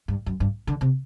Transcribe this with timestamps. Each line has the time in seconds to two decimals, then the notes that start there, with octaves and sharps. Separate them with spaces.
0.08 G2
0.26 F#2
0.40 G2
0.67 D3
0.81 C3